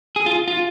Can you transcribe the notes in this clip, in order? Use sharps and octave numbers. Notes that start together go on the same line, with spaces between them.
G#4
F4
F4